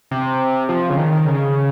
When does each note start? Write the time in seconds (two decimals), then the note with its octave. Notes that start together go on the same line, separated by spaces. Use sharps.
0.11 C3
0.69 F3
0.90 C#3
0.97 D#3
1.12 D#3
1.26 C#3